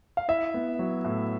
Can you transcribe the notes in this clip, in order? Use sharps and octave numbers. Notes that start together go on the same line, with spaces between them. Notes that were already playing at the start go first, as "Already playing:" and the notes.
F5
E4 E5
B3
F#3
A2